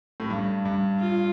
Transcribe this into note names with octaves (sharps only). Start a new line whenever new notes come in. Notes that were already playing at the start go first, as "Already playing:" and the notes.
A2
G2
G2
F4